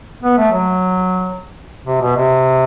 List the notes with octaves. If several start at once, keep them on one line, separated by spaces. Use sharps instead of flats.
B3
A3
F#3
C3
B2
C3